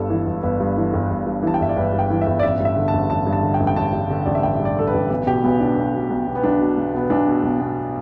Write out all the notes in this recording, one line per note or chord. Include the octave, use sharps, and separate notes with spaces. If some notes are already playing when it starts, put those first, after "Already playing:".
Already playing: G1 G2 A4
E3
G1
G1 B4
G2
E3
G1
G1
G2
E3 A5
G5
G1 E5
D5
G1 B4
G2
G5
E3
E5
G1
D5
A1 E5
G2
E5
D3
A5
A1
A1 A5
G2
A5
D3
G5
A1
G5
A1 A5
G2
D3
A1 D5
E5
A1 G5
G2
D5
D3 A4
B4
A1
B1 B4
B2 G4
B1 B3
B2 D4
B1
B2
B1
B2
B3
B1 D4
B2
B1
B2 B3
B1 D4
B2
B1
B2